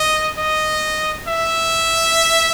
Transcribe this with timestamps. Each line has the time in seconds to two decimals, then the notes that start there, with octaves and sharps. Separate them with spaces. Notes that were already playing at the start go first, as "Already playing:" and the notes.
Already playing: D#5
0.38 D#5
1.28 E5